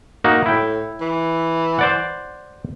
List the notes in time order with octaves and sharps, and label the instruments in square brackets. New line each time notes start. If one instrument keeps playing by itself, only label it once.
[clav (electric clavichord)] A#3 D#4 F#4
[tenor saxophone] A2 [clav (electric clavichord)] E4 G5
[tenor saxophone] E3
[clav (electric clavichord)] C5 D5 F#5